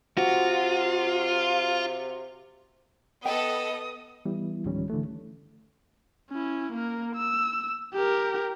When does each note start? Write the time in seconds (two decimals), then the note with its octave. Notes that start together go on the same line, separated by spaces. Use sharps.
0.17 C3 F4 F#4
3.25 B3 A4 D#5 G5 D#6
4.25 E3 G3 B3 E4
4.65 C#2 G#2 D#3 F3 G3 C#4
4.90 D3 E3 A3
6.30 C#4 E4
6.73 A#3 A#4
7.16 E6
7.94 G4 A#4